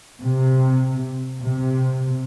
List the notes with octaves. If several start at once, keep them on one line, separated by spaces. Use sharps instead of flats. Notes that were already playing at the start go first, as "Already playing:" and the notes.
C3
C3